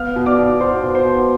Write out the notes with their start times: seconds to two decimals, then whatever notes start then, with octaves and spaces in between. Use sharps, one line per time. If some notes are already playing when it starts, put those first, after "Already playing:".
Already playing: B3 F5 F6
0.16 B2
0.26 D5 D6
0.38 B2
0.60 B2 C5 C6
0.83 B2
0.95 C5 C6
1.05 B2